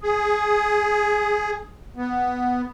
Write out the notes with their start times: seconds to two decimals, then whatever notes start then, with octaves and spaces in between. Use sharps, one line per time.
0.01 G#4
1.97 B3